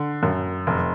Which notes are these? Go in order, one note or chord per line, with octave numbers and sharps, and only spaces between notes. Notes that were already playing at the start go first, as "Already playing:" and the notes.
Already playing: D3
F#2
F1